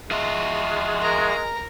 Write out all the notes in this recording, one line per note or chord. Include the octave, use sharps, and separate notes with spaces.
G#3 F4 F#4 G#4 E5
A#4 A#5